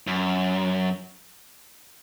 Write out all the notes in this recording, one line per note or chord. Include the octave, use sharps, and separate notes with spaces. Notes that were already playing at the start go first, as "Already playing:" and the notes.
F#2